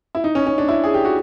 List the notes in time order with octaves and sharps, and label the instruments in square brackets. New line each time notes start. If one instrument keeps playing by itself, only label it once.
[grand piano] E4
D#4
C#4
C#4
D4
E4
G#4
G4
F#4